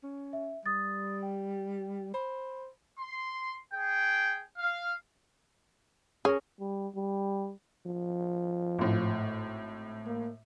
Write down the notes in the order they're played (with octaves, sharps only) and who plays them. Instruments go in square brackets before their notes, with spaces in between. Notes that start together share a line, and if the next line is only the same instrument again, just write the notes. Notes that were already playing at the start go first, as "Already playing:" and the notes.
[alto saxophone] C#4
[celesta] E5
[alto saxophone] G3 [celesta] D#6 A6
[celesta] G5
[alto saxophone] C5 [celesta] B5
[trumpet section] C6
G#4 G5
F5
[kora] C#4 A#4 [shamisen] G#4
[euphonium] G3
G3
[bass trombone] F3
[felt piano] G#1 A2
[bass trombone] A#3